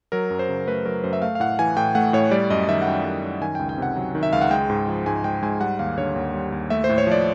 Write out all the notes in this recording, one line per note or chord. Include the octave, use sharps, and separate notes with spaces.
F#3 A#4
F#2
C5
C#3
A3 B4
F#3 A#4
F#2 C5
E5
A3 F5
F5
A2 F#5
E3 G#5
A2 G5
A3 F#5
A2 C#5
G3 D5
F#2 D#5
D#3 E5
F#5
F#2 G5
G3
F#2
D#3 G#5
C#2 G5
G5
C3 F#5
F#3
D#3
E5
C#2 F5
F#5
G#3 G5
G#2
F3
G#2 G#5
G#3 G5
G#2 G#5
G3 F#5
D#2 F5
D3 C#5
D#2
G3
D#2
A3 E5
C5
A2
C#5
F3 D5